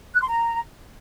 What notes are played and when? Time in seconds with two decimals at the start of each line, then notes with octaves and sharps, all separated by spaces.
0.14 F#6
0.21 C6
0.28 A#5